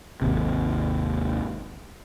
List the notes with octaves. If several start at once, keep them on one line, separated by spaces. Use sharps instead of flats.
G#1 D#2 C3